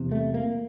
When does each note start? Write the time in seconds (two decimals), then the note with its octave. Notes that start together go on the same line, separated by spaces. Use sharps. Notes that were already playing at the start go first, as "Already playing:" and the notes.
Already playing: E2 C3
0.12 A3
0.34 A#3